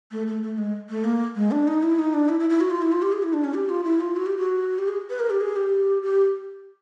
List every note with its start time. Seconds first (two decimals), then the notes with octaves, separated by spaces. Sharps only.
0.11 A3
0.27 A3
0.43 A3
0.58 G#3
0.90 A3
1.04 A#3
1.36 G#3
1.51 D4
1.67 D#4
1.83 E4
1.99 D#4
2.14 D4
2.29 E4
2.39 E4
2.50 E4
2.60 F#4
2.70 F4
2.82 E4
2.92 F4
3.02 G4
3.12 G#4
3.23 E4
3.33 D4
3.44 C#4
3.54 G4
3.69 F4
3.84 E4
4.00 F4
4.16 F#4
4.26 G4
4.37 F#4
4.78 G4
4.88 G#4
5.10 B4
5.19 A#4
5.30 G4
5.41 G#4
5.56 G4
6.03 G4